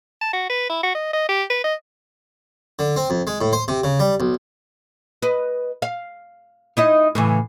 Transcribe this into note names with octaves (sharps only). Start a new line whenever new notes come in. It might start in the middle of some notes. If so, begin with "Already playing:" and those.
A5
F#4
B4
E4
F#4
D#5
D#5
G4
B4
D#5
D3
C4
F2
G#3
A2
C5
C3
C#3
G3
B1
B4 D#5
F5
D#4 E4 D#5
A2 C#3 E3